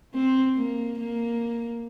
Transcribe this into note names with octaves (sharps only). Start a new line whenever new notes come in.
C4
A#3
A#3